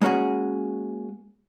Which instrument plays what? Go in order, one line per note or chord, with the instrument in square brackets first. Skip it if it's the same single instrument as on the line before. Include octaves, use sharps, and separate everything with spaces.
[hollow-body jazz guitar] G#3 A#3 C#4 F#4 G#4